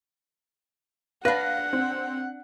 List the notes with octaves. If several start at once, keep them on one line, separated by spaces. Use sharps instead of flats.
D4 B4 F5 F#5 F#6 A#6
C4